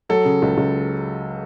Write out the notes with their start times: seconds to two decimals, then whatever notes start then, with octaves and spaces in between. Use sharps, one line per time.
0.09 F#3 A4
0.25 C#3
0.42 C#2
0.57 C#2